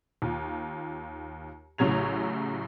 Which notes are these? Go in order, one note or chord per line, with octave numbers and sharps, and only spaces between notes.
D#2 F4
A1 A2 C#3 F#3 G#6 F7